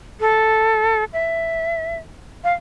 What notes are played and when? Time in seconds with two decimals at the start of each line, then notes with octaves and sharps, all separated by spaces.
0.20 A4
1.13 E5
2.44 F5